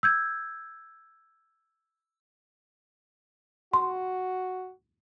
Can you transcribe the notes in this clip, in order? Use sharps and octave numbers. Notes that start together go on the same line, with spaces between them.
E6 G6 G#6
F#4 C6